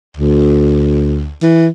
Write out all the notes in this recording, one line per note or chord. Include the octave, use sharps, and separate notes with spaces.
D2
E3